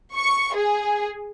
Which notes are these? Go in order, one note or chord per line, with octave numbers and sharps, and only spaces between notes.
C#6
G#4